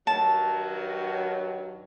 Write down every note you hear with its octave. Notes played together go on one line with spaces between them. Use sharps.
G2 D#3 F#3 A5